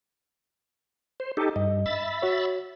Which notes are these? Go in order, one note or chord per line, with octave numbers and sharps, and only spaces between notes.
C5
D#4 G4 A4
G2 D#5
E5 B5 A6
F#4 C#5